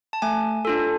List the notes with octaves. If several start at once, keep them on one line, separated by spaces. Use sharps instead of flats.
A5
A3 G#5
D4 F4 A4